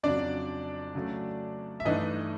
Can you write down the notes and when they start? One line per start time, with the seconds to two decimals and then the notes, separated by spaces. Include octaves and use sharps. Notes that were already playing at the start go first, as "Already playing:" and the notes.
0.03 F2 C#3 F#3 D4 D5
0.95 C#3 F#3 A3
1.80 E5
1.85 G2 E3 A3 D4 D#4 D#5